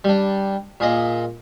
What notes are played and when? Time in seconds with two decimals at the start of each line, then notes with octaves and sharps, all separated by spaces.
0.04 G3 D4
0.80 A#2 G#4 D#5